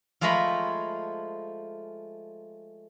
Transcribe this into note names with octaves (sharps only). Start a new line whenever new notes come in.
F3 G#3 A3 G#5 A#5 B5